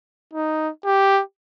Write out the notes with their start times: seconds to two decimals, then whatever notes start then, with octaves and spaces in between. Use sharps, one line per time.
0.33 D#4
0.85 G4